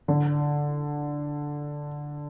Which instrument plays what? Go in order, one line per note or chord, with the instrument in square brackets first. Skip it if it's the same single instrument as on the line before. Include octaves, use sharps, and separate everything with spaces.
[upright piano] D3